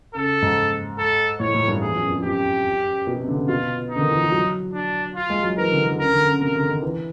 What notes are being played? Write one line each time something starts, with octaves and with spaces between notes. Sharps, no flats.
C#3 A4
G#2
A4
A2 C#5
A2
G2
E2 G#4
F#2
F2
F#2 G4
B2
C3
D3
C#3
B2 F4
D#4
D3
D#3
E3
F3
F#3
D4
F4
G#3
F#3
E3 A#4
D3
D3
C#3 A#4
D3
C#3
C3 A#4
D3
D#3
E3